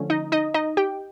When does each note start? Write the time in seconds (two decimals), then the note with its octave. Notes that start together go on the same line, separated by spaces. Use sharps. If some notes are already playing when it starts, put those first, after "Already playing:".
Already playing: D3 F3 A3 C#4
0.10 D#4 D#5
0.32 D#4 D#5
0.54 D#4 D#5
0.77 G4 G5